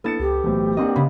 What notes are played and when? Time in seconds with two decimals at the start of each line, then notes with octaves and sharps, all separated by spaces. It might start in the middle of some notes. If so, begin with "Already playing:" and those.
0.04 A#3 B3 D4 E4 A4 A6 C#7 E7
0.20 C#2 G4
0.44 B1 A2 E3 A3 C5
0.77 A#3 C4 D4 D#5 F#5
0.96 C#3 B5